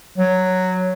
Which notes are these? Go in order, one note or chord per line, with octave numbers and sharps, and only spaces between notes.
F#3